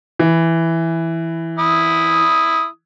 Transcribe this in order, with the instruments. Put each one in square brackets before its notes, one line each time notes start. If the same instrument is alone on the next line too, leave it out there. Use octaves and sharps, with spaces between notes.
[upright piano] E3
[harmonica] E4 D#6